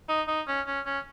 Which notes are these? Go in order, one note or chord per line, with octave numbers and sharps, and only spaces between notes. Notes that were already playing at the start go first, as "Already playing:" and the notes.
D#4
D#4
C#4
C#4
C#4